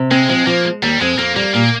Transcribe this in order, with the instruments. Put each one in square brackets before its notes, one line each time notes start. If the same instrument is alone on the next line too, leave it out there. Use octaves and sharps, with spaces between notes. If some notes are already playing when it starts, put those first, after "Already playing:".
Already playing: [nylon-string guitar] C3
[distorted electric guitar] G#3 [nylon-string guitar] C4
[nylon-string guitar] F3 [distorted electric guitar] G#3
[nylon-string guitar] F3 [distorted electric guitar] A#3
[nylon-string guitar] G#3
[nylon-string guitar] D#2 [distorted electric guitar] G3
[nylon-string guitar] F2 [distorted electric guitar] G#3
[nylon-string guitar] F2 [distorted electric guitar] A#3
[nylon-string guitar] G3 [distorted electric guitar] A#3
[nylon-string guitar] A#2 [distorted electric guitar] A#3